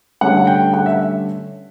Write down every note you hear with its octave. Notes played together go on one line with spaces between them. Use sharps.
G2 D3 A3 C#4 F#5
G5
F#5
E5